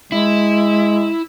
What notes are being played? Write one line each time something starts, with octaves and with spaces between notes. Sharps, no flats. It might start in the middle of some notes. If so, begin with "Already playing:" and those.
G#3 E4